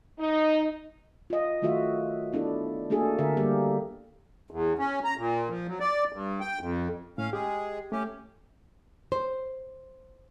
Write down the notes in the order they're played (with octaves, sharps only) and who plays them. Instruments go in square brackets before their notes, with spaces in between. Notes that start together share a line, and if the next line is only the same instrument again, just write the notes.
[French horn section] D#4
[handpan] F4 D#5
D#3 F#3 A3 F4 F#4 E5
B3 D4 E4 A4
A3 A#3 D4 F#4 G#4 A4
D3 A#4 E5
G3 A#3 G4
[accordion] E2
C#4
A#5
A#2
F3
F#3
D5
G2
G5
F2
[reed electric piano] A2 [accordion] C#4 F5
[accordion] G#3 G#4 [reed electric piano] G4
[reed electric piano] A3 [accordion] C#4 G4
[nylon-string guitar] C5